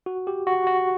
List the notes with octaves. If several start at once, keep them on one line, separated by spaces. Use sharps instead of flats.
F#4
G4
F#4
F#4